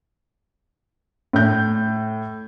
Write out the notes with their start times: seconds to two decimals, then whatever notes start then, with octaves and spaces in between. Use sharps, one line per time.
1.33 A2 G6